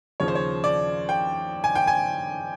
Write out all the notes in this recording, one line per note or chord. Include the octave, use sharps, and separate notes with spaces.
D#2 C#3 F3 C#5
C5
C#5
D5
G5
G#5
G5
G#5